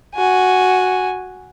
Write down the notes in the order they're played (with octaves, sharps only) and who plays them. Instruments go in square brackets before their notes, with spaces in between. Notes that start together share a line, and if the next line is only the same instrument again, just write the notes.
[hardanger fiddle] F#4 G#5